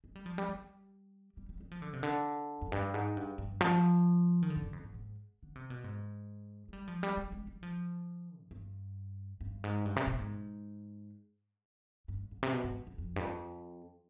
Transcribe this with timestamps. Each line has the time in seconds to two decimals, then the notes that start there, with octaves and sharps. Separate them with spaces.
0.04 G#3
0.15 G3
0.26 F3
0.38 G3
0.49 G3
1.37 G3
1.49 G3
1.60 G3
1.71 F3
1.82 D3
1.93 C3
2.03 D3
2.61 F2
2.72 G2
2.94 G#2
3.17 G2
3.38 G2
3.61 F3
4.42 D#3
4.50 D3
4.56 G#2
4.61 G2
4.73 F2
4.84 G#2
4.94 G#2
5.43 D3
5.55 C3
5.70 B2
5.84 G#2
6.68 G#3
6.73 G3
6.88 F3
7.03 G3
7.17 G3
7.32 G#3
7.47 G3
7.63 F3
8.42 G#2
8.51 G2
9.41 G2
9.64 G#2
9.85 G2
9.96 C3
10.07 B2
10.19 G#2
12.08 G2
12.31 G#2
12.43 C3
12.53 B2
12.64 G#2
12.87 F2
12.98 F2
13.16 G2
13.20 F2